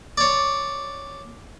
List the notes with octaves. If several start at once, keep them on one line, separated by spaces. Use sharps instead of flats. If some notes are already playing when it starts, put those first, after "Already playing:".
C#5 D5